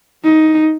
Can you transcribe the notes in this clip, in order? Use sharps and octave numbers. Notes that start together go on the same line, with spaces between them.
D#4